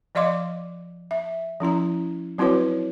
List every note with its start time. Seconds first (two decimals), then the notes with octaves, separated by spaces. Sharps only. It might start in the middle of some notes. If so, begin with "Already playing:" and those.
0.15 F3 D5 D#5 F5 C6 D6
1.11 E5
1.60 F3 C#4 E4 A#5
2.38 F#3 C4 E4 F#4 B4 C#5